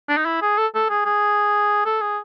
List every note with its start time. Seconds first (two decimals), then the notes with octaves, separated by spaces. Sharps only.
0.09 D4
0.17 D#4
0.26 E4
0.42 G#4
0.58 A4
0.75 A4
0.90 G#4
1.05 G#4
1.85 A4
2.01 G#4